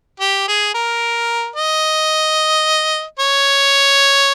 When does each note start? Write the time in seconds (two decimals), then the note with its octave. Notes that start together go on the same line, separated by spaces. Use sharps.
0.20 G4
0.48 G#4
0.74 A#4
1.56 D#5
3.19 C#5